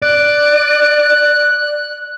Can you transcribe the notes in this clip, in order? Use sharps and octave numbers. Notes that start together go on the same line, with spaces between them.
D5 F#6